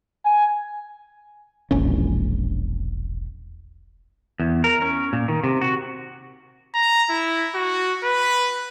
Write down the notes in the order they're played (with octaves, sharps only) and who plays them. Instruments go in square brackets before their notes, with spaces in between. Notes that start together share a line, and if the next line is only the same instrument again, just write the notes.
[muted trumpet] G#5
[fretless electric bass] E1 A#1 C#4
[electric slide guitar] E2
A#4
C#4
A#2
D#3
C3
F#4
[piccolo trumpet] A#5
E4
F#4
B4